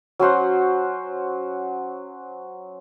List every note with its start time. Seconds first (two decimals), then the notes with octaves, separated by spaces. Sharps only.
0.19 F#3 C#4 C5 F#5